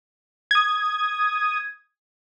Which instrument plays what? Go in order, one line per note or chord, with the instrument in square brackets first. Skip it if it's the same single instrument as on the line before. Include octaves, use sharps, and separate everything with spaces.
[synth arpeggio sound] D#6 G#6